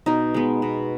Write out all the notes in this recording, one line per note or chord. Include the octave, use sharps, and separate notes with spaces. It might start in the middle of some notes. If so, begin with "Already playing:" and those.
B2 D#4
G#3 B3
B2